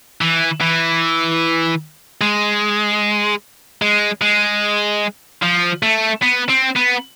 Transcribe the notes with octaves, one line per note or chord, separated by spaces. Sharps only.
E3
E3
G#3
G#3
G#3
F3
A3
B3
C4
B3